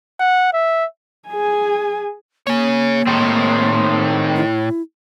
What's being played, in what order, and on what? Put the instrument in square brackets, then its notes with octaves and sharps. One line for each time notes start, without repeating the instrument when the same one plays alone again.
[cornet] F#5
E5
[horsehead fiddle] G#4 G#5
[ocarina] A#3 [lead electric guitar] G#4 C#5
[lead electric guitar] A2 [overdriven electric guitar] D#3 C4
[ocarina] E4